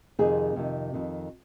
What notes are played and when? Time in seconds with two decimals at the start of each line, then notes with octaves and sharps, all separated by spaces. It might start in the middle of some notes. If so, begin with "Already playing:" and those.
0.19 F2 C3 D#3 G#4
0.56 F2 C3 D#3
0.94 F2 D#3